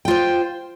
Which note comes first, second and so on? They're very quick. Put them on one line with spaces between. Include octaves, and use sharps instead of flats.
G5 F4 C5